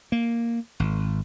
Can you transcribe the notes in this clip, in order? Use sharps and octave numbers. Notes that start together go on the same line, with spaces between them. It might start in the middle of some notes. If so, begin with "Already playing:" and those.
A#3
G#1